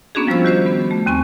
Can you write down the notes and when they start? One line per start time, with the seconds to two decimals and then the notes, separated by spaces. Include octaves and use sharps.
0.15 A#3 B3 C#4 D4 F#4 G#4
0.27 F3 G3 F4 C5 E6
0.45 D#3 F#4 C5 G6
0.67 B3
0.91 A3
1.06 D#2 C4 G#5 C#6